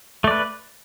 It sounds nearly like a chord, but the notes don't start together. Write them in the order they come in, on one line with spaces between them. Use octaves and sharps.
A3 D5 B4